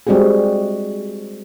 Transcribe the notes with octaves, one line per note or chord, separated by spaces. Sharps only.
G3 G#3 C4 F#4 G#4